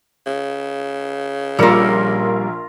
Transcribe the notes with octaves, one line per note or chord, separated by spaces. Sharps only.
C#3
A#1 G3 A#3 F4 A#4 A#5 E6 C#7